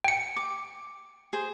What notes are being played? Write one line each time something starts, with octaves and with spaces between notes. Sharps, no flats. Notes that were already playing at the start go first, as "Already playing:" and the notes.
G5 C#7
D6
G#4 C5